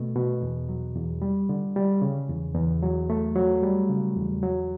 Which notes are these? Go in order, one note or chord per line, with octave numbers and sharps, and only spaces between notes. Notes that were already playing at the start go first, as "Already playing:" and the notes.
Already playing: B2 A3
B2
E2
F#3
E2
G3
D3
G3
C#3
E2
E2
F#3
A3
F#3
G3
C#3
E2
F#3